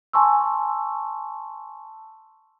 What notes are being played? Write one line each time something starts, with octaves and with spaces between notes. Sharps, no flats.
G#5 A5 C6 C#6 E6